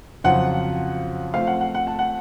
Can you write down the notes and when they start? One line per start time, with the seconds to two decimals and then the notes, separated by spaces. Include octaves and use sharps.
0.24 F2 C#3 F#3 C4 F4 F#5
1.34 F3 A3 C4 F5
1.47 F#5
1.61 F#5
1.75 F#5
1.87 A5
1.99 F#5